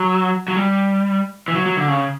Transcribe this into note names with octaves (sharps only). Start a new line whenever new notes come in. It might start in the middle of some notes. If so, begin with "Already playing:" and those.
Already playing: F#3
F#3
G3
E3
F#3
F#3
D3
C#3